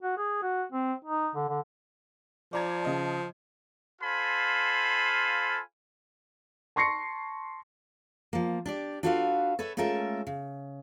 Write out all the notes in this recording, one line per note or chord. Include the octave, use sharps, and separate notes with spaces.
F#4
G#4
F#4
C4
D#4
D3
D3
F3 D5 A#5 G#6
C#3 D#5 A5
F4 A4 C5 F5 G#5 B5
A5 C6 C#6 A#6 C7 C#7
F3 A#3
D4 G4 D5
D4 F4 F#4 A4 B4 F5
A4 B4 C#5 E5
G#3 A3 C#4 F4 A#4 E5
C#3